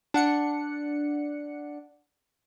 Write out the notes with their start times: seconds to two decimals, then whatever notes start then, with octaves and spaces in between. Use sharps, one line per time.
0.14 D4 F#5 C#7